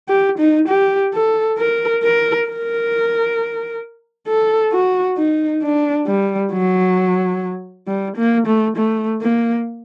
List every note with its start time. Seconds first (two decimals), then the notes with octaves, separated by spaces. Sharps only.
0.09 G4
0.38 D#4
0.68 G4
1.14 A4
1.58 A#4
2.04 A#4
2.48 A#4
4.28 A4
4.72 F#4
5.18 D#4
5.63 D4
6.07 G3
6.52 F#3
7.87 G3
8.17 A#3
8.47 A3
8.77 A3
9.22 A#3